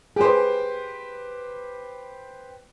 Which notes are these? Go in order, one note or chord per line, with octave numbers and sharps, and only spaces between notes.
G4 G#4 B4 C5